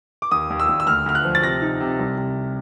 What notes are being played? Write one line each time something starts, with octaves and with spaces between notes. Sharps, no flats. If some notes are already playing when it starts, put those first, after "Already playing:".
D6
D#2 D#6
D#2
E6
D#2
E6
D2 F6
D2 F6
F#6
F3
A6
C3 A#6
D#4
C3
C2
C3